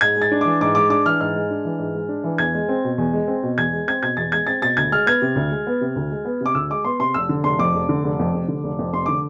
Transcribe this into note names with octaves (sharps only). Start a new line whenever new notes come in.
G#2 G#6
G#3
A6
D4
E3 D6
G#2 D6
G#3 D6
D4 D6
E3 F6
G#2 F6
G#3
D4
E3
G#2
G#3
D4
E3
E2 G#6
G#3
C4
B2
E2
G#3
C4
B2
E2 G#6
G#3
C4 G#6
B2 G#6
E2 A6
G#3 G#6
C4 A6
B2 A6
D2 G#6
G#3 F6
B3 G#6
C3
D2
G#3
B3
C3
D2
G#3
B3
C3 D6
D2 E6
G#3 D6
B3 C6
C3 C6
F1 E6
D3
F1 C6
F2 D6
F1
D3
F1
F2
F1
D3
F1
F2
F1 C6
D3 D6